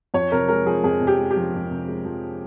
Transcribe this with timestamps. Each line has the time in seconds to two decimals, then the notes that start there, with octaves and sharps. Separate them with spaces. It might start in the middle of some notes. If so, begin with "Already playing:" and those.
0.14 F2 C#5
0.32 C3 A#4
0.48 G#3 A#4
0.66 F3 G#4
0.84 F2 G#4
1.01 C3
1.07 G4
1.18 G#3
1.31 G4
1.36 F3
1.54 F2
1.70 C3
1.88 G#3
2.05 F3